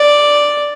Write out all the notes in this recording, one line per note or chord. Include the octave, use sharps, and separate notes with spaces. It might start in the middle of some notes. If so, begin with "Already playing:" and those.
Already playing: D5